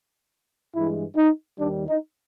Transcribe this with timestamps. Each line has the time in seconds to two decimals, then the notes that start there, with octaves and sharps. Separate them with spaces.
0.74 G2 E3 G#3 E4
1.16 D#4
1.58 D#2 D#3 G3 D4
1.88 D#4